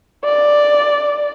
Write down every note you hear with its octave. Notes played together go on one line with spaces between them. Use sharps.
D5